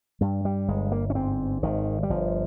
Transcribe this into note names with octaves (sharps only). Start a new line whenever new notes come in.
G2 G3
G3
G1 G#3
A#3
C#4
G#2 C4
G#1 D#3
G3
G1 F3